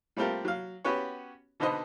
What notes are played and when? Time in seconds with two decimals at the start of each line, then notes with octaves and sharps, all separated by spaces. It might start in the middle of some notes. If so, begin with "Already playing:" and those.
0.17 G3 A3 C4 F4 G4 A#4
0.45 F#3 F5
0.84 B3 C#4 F#4 G4 B4 C#5
1.60 B2 D3 D#4 B4 C5 D#5